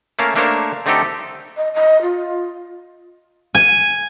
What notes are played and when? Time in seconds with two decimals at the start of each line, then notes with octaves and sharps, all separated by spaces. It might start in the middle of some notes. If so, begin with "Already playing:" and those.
0.19 A3 A#3 C#4 A#4 F5 A5
0.36 A3 A#3 D4 A#4 C5 C#5
0.86 D3 A3 C4 D#4 G4 A4
1.57 D#5
1.74 D#5
2.02 F4
3.55 G#5